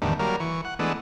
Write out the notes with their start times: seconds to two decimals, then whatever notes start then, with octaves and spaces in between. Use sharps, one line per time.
0.02 E2 A2 D3 D#3 G3
0.19 F#3 G3 A#3 A#4
0.40 E3 C#6
0.65 F#5
0.79 E3 G#3 A3 B3 D4